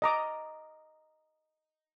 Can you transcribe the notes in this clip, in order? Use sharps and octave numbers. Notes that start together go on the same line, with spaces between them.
D#5 A#5 D6